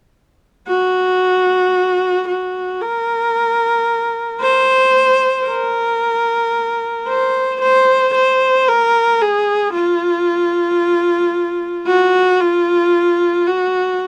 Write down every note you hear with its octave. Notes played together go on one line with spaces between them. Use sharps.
F#4
F#4
A#4
C5
A#4
C5
C5
C5
A#4
G#4
F4
F#4
F4
F#4